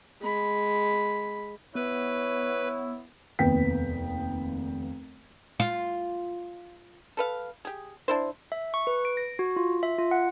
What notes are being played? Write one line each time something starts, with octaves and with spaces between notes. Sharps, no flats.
G#3 B5
B3 E4 B4 C#5
F1 D#2 B3 G5 B6
F4
A4 B4 F5
G4 G#4
D4 E4 C5
E5
C#6
B4
D7
A#6
F#4
F4
E5
F4
F#5